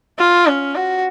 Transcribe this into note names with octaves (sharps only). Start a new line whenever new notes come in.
F4
C#4
F#4